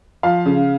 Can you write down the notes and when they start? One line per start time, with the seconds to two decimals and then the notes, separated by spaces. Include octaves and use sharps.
0.23 F3 F5
0.46 C#3